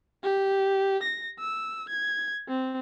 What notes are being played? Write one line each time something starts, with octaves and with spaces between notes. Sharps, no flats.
G4
A#6
E6
G#6
C4